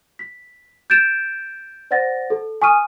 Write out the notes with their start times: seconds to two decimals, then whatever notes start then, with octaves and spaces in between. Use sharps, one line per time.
0.19 B6
0.90 G6 A6 D7 E7
1.91 C5 D5 F#5 A6 A#6
2.30 A4
2.62 G#5 C#6 D#6 F6 D#7